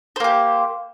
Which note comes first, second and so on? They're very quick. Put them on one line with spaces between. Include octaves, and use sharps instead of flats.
C5 A#3 G4